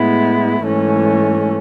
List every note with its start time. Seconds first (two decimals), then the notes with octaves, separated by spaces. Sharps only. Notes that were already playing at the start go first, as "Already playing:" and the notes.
Already playing: A2 G#3 B3 E4
0.63 G#2 E3 A3 C#4